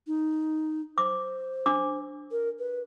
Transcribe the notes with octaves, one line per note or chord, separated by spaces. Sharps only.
D#4
C5 D6
D4 D6
A#4
B4